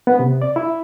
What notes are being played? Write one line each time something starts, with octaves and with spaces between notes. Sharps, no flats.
B3
C3
D5
E4